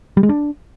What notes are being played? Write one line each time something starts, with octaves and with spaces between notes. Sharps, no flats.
G3
G#3
D4